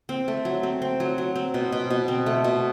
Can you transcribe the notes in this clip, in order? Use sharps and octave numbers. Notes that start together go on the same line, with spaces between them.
C4
A3
F#3
C4
C4
F#3
F#3
C4
B2
B2
B2
C4
A3
B2